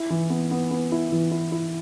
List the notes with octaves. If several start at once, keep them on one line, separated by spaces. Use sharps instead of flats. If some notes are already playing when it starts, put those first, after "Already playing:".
Already playing: E4
E3
B3
B3
B3
E4
E3
E4
E4